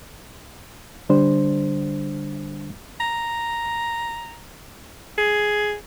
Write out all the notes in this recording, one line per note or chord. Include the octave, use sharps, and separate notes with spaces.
D3 G3 D4 C5
A#5
G#4